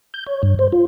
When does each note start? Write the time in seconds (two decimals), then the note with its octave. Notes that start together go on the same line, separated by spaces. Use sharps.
0.14 G6
0.27 C#5
0.43 G2
0.59 C5
0.72 F4